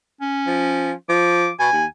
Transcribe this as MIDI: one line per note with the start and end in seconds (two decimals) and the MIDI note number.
0.21 0.93 61
0.47 0.93 53
1.09 1.49 53
1.09 1.51 86
1.59 1.69 47
1.59 1.85 80
1.73 1.86 39